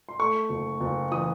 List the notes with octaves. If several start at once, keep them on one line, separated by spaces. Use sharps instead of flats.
C6
A3 C#6
F#1
F#1
E3 D#6